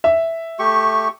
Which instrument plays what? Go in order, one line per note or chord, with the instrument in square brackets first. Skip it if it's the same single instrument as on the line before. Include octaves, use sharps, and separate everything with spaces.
[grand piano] E5
[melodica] A3 G4 C#6